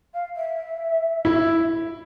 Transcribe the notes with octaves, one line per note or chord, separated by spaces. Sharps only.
F5
E5
E4